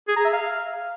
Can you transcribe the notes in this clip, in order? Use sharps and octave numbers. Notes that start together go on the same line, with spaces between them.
G#4
A#5
E5
F5